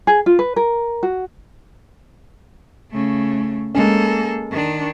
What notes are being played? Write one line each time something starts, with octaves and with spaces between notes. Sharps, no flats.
G#4
F4
B4
A#4
F#4
C#3 A3
G#3 A#3 C#4 A4
D#3 D4